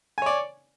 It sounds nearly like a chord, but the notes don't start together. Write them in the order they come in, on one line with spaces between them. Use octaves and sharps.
G#5 C#5 D5